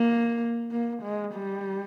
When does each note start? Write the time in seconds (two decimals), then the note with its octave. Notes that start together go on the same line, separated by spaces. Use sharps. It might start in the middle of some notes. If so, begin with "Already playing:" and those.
Already playing: A#3
0.71 A#3
1.03 G#3
1.34 G3